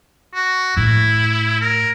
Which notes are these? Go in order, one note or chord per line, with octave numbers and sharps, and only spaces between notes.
F#4
A2 E4
A#4